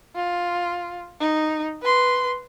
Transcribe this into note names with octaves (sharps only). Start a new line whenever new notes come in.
F4
D#4
B4 C6